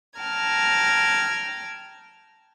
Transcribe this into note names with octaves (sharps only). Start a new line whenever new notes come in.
G5 A5 A#5 F6 G#6